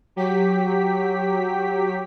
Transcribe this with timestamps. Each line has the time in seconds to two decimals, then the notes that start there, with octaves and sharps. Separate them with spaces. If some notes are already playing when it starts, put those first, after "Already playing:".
0.16 F#3 G4 B6